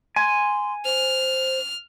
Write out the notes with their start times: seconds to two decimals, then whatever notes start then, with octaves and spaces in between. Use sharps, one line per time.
0.16 G#5 C6
0.85 C5 F6